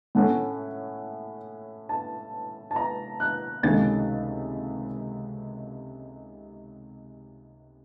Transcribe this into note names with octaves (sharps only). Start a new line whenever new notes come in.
A2 A3 C#4 F#5
A5
A5
A#5
F#6
C#2 C3 D#3 A3 C#4 A6